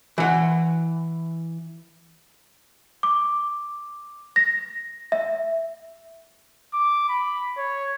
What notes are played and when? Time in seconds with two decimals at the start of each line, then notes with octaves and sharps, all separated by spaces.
0.18 E3 F#5
3.03 D6
4.36 A#6
5.12 E5
6.74 D6
7.09 B5
7.57 C#5